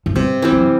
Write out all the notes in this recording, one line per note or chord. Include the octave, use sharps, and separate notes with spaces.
F#2
G2 C3
E3 G3 C4
F#2